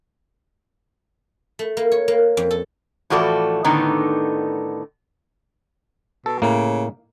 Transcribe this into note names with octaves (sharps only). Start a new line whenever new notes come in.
A3
A#3
C#5
A#3
F2
A4
A2 E3 F3 F#4 A4 D5
A2 D3 D#3 B3 D#4
B2 A4
A2 C#3 A#3